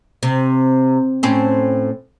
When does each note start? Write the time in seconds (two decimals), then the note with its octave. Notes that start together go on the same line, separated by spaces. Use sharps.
0.23 C3
1.23 A2 C4 C#4